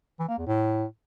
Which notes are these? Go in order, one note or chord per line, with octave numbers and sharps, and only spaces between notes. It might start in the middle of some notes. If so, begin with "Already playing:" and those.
E3
A#3
E2
A2